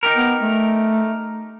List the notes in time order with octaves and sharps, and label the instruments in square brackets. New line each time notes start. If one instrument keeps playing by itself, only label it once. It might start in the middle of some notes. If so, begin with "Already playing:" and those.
[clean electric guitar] D#4 G4 A#4
[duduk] B3
A3